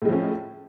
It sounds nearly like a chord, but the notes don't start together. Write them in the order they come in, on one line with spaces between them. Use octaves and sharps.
A2 G#3 F3 C#4